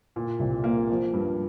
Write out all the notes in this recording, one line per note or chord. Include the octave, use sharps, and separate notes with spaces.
A#2
C2
A#3
F3
G2